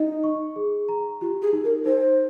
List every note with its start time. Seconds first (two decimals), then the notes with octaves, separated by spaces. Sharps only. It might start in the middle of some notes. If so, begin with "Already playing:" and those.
Already playing: D#4 D#5
0.24 C#6
0.56 G#4
0.89 A#5
1.21 F4 G4
1.42 G#4
1.53 D#4
1.64 A#4
1.85 D#4 C5